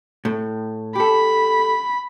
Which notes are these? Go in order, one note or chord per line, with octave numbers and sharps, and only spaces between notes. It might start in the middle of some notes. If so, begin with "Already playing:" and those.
A2
G4 A4 B5